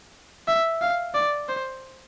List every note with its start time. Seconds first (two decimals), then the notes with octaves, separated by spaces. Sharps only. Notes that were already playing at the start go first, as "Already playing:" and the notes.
0.48 E5
0.82 F5
1.15 D5
1.49 C5